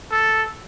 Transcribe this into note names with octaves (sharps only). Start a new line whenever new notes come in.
A4